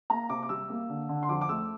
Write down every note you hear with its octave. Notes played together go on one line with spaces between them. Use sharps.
A#3 A#5
C3 D6
D6
G3 E6
A#3
D3
D3
C6
F2 D6
D6
A3 E6